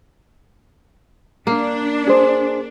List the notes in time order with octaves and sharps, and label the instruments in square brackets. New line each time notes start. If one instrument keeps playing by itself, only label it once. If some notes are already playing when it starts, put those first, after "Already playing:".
[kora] A#3 [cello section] D4
[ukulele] G#4 C5